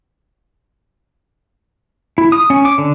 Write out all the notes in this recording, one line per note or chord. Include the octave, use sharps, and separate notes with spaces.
E4
D#6
C#4
D6
D3